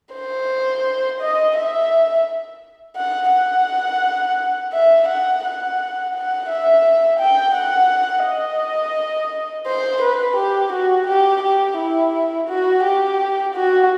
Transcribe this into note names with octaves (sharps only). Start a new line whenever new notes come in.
C5
D#5
E5
F#5
F#5
E5
F#5
F#5
F#5
E5
G5
F#5
D#5
C5
B4
G4
F#4
G4
G4
E4
F#4
G4
F#4